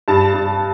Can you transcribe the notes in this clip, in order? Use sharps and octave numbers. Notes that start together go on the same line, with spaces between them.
G2 A5
G2